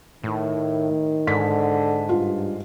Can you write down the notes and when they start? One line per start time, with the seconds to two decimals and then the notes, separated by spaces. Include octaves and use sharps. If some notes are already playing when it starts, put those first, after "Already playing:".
0.24 A2 D#3
1.27 G#2 D3 B6
2.09 G2 F4